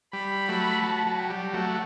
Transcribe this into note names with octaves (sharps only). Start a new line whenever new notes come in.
G3 B5
F#3 A3
F#3 A5
F#3
G5
G3
F#3 A3 F#5